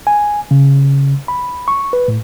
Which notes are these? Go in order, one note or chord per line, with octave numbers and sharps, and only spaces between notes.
G#5
C#3
B5
C#6
B4
A2